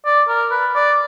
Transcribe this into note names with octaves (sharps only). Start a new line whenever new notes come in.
D5
A#4
B4
D5